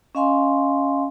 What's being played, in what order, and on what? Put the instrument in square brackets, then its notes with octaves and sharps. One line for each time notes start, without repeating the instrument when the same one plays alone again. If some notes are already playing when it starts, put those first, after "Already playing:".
[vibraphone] C#4 D#5 F5 G#5 C6